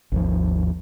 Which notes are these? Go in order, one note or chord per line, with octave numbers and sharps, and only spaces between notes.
G#1 D#2 F3